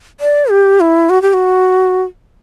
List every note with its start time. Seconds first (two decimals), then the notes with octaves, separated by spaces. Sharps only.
0.20 D5
0.50 G4
0.80 E4
1.10 F#4
1.22 G4
1.33 F#4